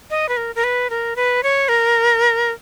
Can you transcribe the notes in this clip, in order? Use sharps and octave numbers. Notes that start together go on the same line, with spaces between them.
D#5
B4
A#4
A#4
B4
A#4
B4
C#5
A#4